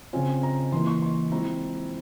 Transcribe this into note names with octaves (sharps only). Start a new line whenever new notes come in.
C#3 F3 C4 F4 G#5
A#5
E3 A#3 E4 C6
C#6
C6
F3 G#3 C4 E4 A#5